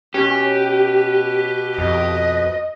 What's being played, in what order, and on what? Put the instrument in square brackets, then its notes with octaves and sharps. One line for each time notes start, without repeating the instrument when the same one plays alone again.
[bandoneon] B2 B4 [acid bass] C#4 [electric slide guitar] G4
[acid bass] F2 [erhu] D#5